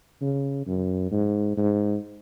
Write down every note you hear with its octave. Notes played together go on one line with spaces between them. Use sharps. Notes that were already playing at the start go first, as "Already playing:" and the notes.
C#3
F#2
G#2
G#2